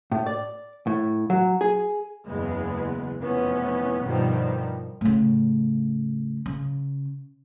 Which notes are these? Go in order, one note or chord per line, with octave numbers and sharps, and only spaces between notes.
A2
D5
A2
F#3
G#4
F#1 E2 C#3 G#3 B3
F1 C3 E3 B3 C#4
G2 B2 D#3 F3 G3
A2 C#3
C#3